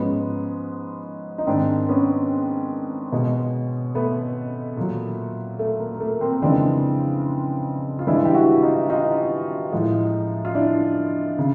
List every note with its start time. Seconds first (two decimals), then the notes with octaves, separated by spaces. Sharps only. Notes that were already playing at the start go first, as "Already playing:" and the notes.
Already playing: G#2 F3 G#3 B3 C#4
1.38 D#4
1.47 G#2 D#3 G#3 C4 D4
1.88 B3 C#4
3.12 B2 G#3
3.95 A3 B3
4.77 A#2 F#3
5.59 A3
5.80 A#3
5.95 A#3
6.00 A3
6.21 A#3 C4
6.42 F2 C#3 E3 G#3 C4 D4
7.99 F4
8.07 G2 E3 G#3 D4 E4
8.25 G4
8.34 E4 F#4
8.62 D#4 F4
8.90 D#4 F4
9.72 A2 F3 G#3
10.45 F4
10.54 D4 E4
11.39 C#3